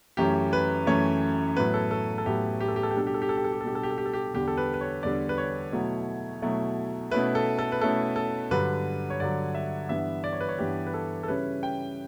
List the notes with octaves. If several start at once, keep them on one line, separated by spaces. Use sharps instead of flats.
F#2 E3 A3 C#4 G4
B4
F#2 E3 A3 C#4 C#5
A2 F#3 B3 E4 B4
A4
A4
A4
A2 F#3 B3 E4 G4
G4
A4
G4
A4
G4
B2 G3 D4 A4
G4
A4
G4
A4
G4
A4
G4
A4
B2 G3 D4 G4
A4
G4
A4
G4
A4
G4
E2 D3 G3 D4 G4
A4
B4
B4
C#5
E2 D3 G3 D4 D5
B4
C#5
B2 F#3 A3 E4
B2 F#3 A3 E4
B2 A3 C#4 E4 B4
A4
A4
B4
B2 A3 C#4 E4 A4
A4
G2 D3 F#3 B4
C#5
G2 D3 F#3 D5
E5
G2 E3 B3 D4 E5
D5
C#5
B4
C#5
G2 E3 B3 D4 G4
B4
A4
A4
C#3 G3 C#4 E4 B4
G5